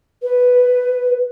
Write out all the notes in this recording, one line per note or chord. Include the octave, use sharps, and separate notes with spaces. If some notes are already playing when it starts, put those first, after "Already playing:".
B4